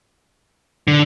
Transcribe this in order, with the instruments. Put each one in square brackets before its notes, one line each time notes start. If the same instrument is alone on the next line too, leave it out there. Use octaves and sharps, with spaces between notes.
[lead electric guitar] D3